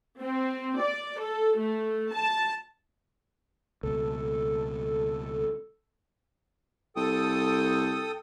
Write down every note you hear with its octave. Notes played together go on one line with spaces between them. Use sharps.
C4
D5
A4
A3
A5
C#2 B2 A4
C2 A4 G5 D#6